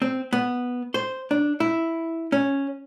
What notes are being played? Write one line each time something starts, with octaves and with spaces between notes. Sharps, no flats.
C4
B3
C5
D4
E4
C#4